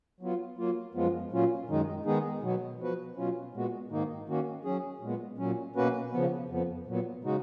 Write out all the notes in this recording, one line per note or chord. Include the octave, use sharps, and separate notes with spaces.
F#3 B3 F4
F#3 A#3 F4
F#2 F3 G#3 B3 F4
A#2 F#3 C#4 F4
F#2 D#3 G#3 D#4
D#3 G#3 B3 D#4 G#4
B2 F#3 B3
F3 B3 F#4 B4
B2 F#3 C#4 F4
A#2 G#3 B3 F#4
G#2 D#3 A#3 D#4
D#3 A#3 C#4 F#4
F#3 C#4 G#4
A#2 G#3 B3
A#2 F#3 C#4
B2 A#3 C#4 F#4 B4
C#3 F3 B3
F2 F3 B3
A#2 F#3 B3
C#3 G#3 D#4 F#4